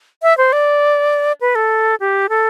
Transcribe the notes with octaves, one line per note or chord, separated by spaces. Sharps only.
E5
C5
D5
B4
A4
G4
A4